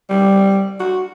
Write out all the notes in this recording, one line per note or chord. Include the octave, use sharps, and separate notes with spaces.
G3
F#4